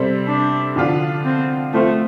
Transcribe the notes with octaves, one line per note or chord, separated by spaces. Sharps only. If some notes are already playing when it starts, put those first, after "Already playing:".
Already playing: C3 G3 C4 A4 C5
D4
D3 F3 D4 F4
C4
F3 A3 C4 F4 C5